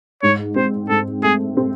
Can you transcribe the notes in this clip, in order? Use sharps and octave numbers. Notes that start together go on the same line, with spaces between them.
G#2 C#5
C4 C5
G#2 A4
A3 G#4
C4